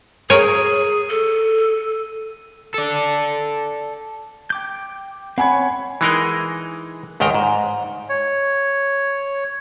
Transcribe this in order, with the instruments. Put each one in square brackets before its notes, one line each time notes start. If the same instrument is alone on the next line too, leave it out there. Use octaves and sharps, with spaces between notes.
[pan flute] G#4 [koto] A#4 C#5 [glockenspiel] D#7
[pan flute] A4
[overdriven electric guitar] A4 D5
[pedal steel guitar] G5 D6 G6
[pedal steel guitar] C4 C#5 [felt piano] F#5 G#5 B5
[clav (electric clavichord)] E3 G#3 D#4 G#4 A#4 D#5
C#2 G#2 D#3 G5 A#5
G#2
[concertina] C#5